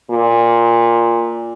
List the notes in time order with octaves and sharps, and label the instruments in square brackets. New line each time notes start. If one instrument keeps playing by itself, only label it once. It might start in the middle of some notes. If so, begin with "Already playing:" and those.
[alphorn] A#2